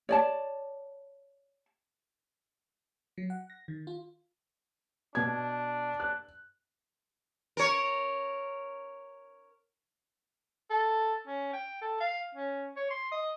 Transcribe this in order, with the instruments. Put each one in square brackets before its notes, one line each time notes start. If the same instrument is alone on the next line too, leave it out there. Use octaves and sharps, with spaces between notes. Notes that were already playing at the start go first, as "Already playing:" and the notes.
[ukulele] C#5 D5 A5
[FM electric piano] F#3
F#5
A#6
D#3
F4
[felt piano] B2 G#6 [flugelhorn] D4
[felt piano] F#6
[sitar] A#4 C#5
[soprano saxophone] A4
C#4
G5
A4
F5
C#4
C#5
C6
D#5